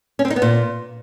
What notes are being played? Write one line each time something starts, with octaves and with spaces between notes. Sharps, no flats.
C#4
C4
D#4
B3
A#2